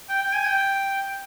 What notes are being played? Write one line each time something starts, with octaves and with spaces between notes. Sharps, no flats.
G5
G5
G#5
G5